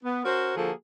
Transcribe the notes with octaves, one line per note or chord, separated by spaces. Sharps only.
B3
C#4 F#4 A#4 C5
D3 F3 A#3 F#4 G#4 A4